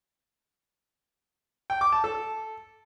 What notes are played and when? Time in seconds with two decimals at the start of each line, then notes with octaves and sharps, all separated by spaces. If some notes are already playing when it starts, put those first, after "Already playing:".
1.70 G5
1.81 D6
1.92 A5
2.04 A4